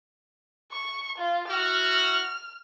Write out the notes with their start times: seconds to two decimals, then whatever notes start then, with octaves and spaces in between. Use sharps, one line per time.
0.72 C#6
1.18 F4
1.48 E4 F#4 F6